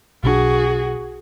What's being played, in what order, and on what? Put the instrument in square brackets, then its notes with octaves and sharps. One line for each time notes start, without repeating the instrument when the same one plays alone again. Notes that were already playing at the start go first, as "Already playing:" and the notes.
[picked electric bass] B1 D4 [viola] F#4 G#4